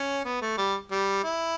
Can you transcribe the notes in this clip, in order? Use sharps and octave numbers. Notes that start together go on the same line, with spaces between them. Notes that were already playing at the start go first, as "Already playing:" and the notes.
Already playing: C#4
B3
A3
G3
G3
E4